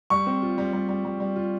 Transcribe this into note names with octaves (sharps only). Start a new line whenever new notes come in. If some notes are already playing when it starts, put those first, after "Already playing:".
G3 C#6
C4
F4
G3
G3
G3
G3
G3
F4